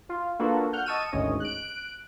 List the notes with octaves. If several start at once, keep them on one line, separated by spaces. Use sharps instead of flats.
F4
A#3 D4 F4 F#4 A4 B4
F#5 F6 G6
D#5 A5 C#6 E6 D#7
G#1 D2 G#2 C#4 C#5 D#5
F#6 D7